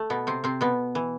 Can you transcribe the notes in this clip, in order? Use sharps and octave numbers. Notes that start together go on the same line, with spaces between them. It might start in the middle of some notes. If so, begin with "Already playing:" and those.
Already playing: A3
B2 B3
C3 C4
C3 C4
B2 B3
E3